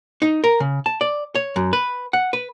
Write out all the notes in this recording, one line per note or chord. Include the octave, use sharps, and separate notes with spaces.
D#4
A#4
C#3
A5
D5
C#5
F#2
B4
F#5
B4